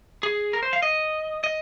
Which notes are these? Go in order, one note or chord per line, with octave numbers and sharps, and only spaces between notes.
G#4
A#4
C5
F5
D#5
D#5